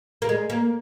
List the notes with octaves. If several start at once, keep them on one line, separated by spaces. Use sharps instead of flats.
A#3
G#3
A#3